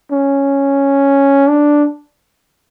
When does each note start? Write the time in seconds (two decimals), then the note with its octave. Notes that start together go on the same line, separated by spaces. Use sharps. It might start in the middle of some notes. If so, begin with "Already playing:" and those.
0.11 C#4
1.49 D4